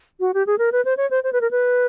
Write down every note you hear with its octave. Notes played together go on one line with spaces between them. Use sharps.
F#4
G4
G#4
A#4
B4
C5
C#5
C5
C5
B4
A#4
B4